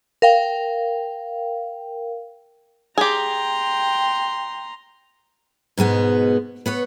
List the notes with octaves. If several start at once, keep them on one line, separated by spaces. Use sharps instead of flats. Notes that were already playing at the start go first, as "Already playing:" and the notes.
A#4 F5 G5
G4 G#4 G5 A#5 C6
G#2 B2 G#3 B3
B3 B4 C#5